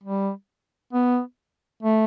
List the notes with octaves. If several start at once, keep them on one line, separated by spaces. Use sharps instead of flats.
G3
B3
A3